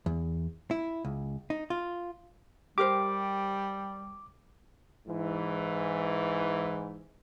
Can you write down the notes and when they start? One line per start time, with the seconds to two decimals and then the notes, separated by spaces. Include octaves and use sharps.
0.06 E2
0.71 E4
1.05 C#2
1.50 D#4
1.70 F4
2.78 G3 G4 A#4 C5 D6
5.07 G#2 E3